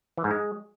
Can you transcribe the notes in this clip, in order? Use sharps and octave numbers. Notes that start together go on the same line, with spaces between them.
E3
G#2
G#3